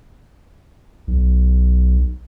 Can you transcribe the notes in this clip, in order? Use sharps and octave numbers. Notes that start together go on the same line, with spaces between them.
B1